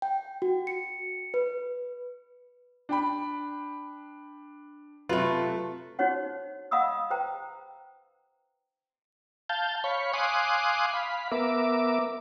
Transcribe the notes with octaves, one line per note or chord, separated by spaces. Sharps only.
G5
F#4
C#7
B4
D4 G5 B5
C3 F#3 A3 F4 B4
D#4 F#4 C5 C#5 F#5
D#5 F5 F#5 B5 D#6 E6
B4 C5 G5 A#5
F5 A5 G6
C#5 F5 B5 C#6
F5 G#5 C6 D6 D#6 F#6
F5 B5
B3 A#4 E5 D6